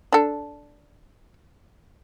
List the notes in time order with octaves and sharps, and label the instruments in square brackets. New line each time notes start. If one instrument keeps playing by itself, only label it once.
[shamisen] D4 A4